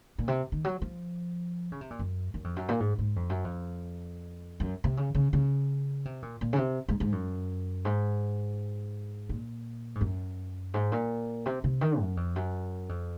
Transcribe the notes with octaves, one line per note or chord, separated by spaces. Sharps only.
A#2
C3
D#3
F#3
F3
C#3
C3
A#2
F#2
F#2
F2
F#2
A#2
G#2
G#2
F2
F#2
F2
F#2
C3
C#3
C#3
C#3
C3
A#2
A#2
C#3
C3
G#2
G#2
F#2
G#2
A#2
G#2
F#2
G#2
A#2
C3
C3
D#3
F#2
F2
F#2
F2